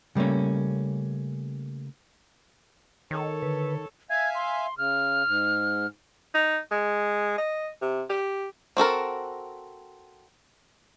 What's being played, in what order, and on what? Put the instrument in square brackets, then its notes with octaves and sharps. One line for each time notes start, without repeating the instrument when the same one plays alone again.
[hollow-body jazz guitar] C#3 G3 A3 A#3 C#4
[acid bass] D#3 [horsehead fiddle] A4 C#5
[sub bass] D3 [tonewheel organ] B4
[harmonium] E5 F5 G#5 [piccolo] G#6
[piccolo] C6
[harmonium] C#3 [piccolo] F6
[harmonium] G#2
[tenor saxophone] D#4
G#3
D#5
C3
G4
[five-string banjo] C4 F#4 A4 A#4